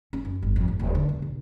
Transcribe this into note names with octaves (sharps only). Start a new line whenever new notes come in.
C#4
F#2
G1
F2
G#1
D#1
D3
E1
B1